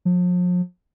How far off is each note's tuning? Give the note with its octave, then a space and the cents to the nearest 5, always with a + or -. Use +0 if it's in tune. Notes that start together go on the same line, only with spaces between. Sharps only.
F3 +40